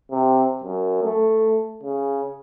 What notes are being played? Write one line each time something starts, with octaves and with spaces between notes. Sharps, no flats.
C3
F#2
A3
C#3